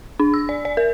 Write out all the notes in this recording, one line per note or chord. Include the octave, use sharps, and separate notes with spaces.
D4
E6
D5
D5
A#4